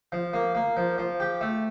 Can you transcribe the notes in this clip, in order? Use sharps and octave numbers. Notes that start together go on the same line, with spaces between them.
F3
A#3
A#3
F3
F3
G4
A3